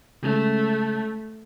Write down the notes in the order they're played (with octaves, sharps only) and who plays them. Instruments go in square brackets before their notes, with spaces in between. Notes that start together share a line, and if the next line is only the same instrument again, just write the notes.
[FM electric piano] C#3 G#3 C#4 [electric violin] A3